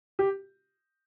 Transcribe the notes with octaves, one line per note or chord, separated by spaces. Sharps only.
G4